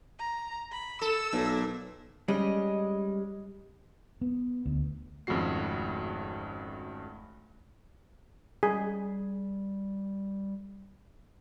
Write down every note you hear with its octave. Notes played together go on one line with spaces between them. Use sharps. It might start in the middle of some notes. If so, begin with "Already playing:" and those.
A#5
B5
A4 E6
B1 A#2
G3 G#3 C#4 D#5
B3
D2
G#1 F2 C#3 A3 F#4 C7
G3 G#4